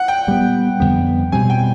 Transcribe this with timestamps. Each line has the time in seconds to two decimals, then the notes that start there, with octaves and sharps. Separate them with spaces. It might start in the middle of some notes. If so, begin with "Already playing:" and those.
Already playing: F#5
0.08 G5
0.27 A#2 G3 B3
0.80 F2 D3 G3 B3
1.32 B2 G3 C4 G#5
1.50 G5